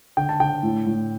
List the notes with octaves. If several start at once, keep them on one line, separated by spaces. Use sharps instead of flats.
D3 G5
A5
D3 G5
A2
A2